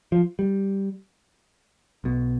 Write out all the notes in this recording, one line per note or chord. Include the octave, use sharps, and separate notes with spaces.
F3
G3
B1 B2